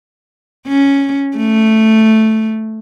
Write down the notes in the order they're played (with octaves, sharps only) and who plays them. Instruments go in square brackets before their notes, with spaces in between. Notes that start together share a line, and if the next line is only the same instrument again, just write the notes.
[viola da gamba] C#4
A3